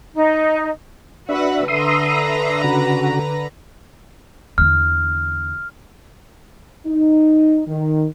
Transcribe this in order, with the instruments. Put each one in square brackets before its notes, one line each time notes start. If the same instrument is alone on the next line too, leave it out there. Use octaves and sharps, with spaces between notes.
[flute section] D#4
[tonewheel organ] D4 E5 [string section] F#4 B4 F#5
[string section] D3 B4 A#5 [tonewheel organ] E5 C6 D#6
[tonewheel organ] C#3 F#4
[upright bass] E2 D3 [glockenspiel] F6
[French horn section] D#4
D#3